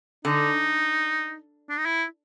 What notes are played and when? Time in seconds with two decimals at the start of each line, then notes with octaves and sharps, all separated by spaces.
0.25 D3 D#4
1.69 D4
1.78 D#4
1.86 E4